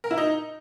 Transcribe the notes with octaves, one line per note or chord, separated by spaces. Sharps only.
A#4
E4
D#4